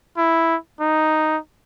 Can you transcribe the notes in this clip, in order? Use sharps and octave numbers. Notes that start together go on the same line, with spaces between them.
E4
D#4